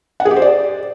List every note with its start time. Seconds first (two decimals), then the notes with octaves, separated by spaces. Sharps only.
0.20 F#5
0.25 G#4
0.31 G4
0.36 C5
0.42 D5